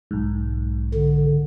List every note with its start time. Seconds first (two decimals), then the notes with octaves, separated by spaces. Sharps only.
0.11 B1 G#2
0.94 D3